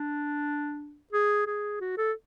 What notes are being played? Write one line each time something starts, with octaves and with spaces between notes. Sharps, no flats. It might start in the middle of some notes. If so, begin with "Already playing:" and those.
Already playing: D4
G#4
G#4
F#4
A4